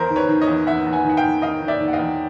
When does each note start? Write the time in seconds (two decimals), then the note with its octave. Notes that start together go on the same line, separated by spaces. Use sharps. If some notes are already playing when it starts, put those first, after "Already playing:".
Already playing: E2 A#4 C5
0.10 D#3
0.16 B4 C#5
0.29 D#3
0.41 C#5 D#5
0.47 E2
0.67 E2 E5 F#5
0.86 E2
0.92 F#5 G#5
1.05 D#3 F#5
1.17 F5 G5
1.23 D#3
1.42 D#3 D#5 F5
1.62 D#3
1.68 D5 E5
1.80 D#3
1.88 F#5
1.93 D#5 F5
1.99 E2